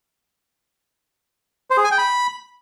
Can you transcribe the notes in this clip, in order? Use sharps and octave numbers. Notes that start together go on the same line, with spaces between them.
C5
G#4
G#5
G5
B5